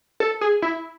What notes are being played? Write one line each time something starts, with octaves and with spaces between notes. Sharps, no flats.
A4
G#4
E4